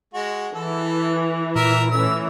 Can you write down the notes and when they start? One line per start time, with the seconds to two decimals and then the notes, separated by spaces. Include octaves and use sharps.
0.14 G#3 F#4
0.54 E3 A4
1.56 A#2 A#4 E5
1.91 E3 A3 C#4 E6